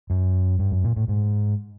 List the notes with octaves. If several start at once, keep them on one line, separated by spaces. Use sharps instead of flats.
F#2
G2
F#2
A#2
A2
G#2